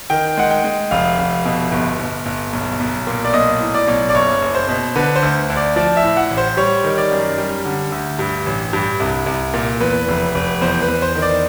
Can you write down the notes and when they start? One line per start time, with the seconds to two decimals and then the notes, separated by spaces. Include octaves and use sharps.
0.10 D#3 G5
0.38 G#3 F#5
0.51 G5
0.64 G#3
0.91 F1 F5
1.18 F1
1.45 B2
1.72 G1
1.99 G1
2.26 G1
2.53 B1
2.80 B1
3.07 A#2
3.25 D5
3.34 B1 D#5
3.61 A2
3.74 D5
3.88 B1
4.09 D5
4.15 F#1 C#5
4.42 F#1
4.55 C5
4.68 B2
4.96 D3 B4
5.16 C5
5.23 D2
5.50 D2
5.57 D5
5.76 F3 D5
5.97 E5
6.03 A2
6.17 F#5
6.31 A1
6.37 C5
6.57 G3 C#5
6.84 D#3
6.98 D5
7.12 F#2
7.38 G3
7.65 D3
7.92 D2
8.19 G2
8.46 A1
8.73 G2
9.00 C2
9.26 C2
9.54 A#2
9.80 E2 B4
10.08 F1
10.35 F1
10.61 E2 C5
10.82 B4
10.88 E2
11.02 C5
11.15 D#3
11.22 D5